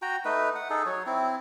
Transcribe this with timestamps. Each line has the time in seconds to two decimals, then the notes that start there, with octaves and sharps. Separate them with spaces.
0.02 F#4 G5 A#5
0.25 A3 D#4 B4
0.55 F#5
0.70 D#4 G#4 A4
0.86 F#3 C#5
1.06 C4 E4